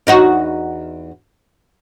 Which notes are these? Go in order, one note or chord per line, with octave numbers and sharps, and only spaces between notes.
E2 D#4 F#4